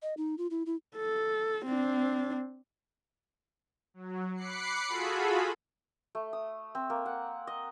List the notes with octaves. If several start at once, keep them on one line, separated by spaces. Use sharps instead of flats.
D#5
D#4
F4
E4
E4
A4
C4 D4
F#3
B5 D6 F#6 C7 C#7
F4 F#4 G#4 A4 B5
A3
D#6
C4
A#3
F#5
D#5